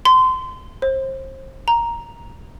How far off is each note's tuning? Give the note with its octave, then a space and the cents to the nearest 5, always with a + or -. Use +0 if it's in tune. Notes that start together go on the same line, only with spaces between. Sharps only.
C6 -25
C5 +30
A#5 +5